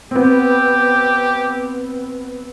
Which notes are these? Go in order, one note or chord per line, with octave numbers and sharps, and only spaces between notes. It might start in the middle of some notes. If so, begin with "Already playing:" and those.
B3 C4 G4